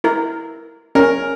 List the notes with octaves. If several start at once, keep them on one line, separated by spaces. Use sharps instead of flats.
E4 A#4
C#4 A#4